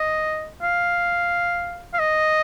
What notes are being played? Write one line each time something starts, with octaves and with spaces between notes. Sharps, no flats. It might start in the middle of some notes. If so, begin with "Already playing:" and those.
Already playing: D#5
F5
F5
D#5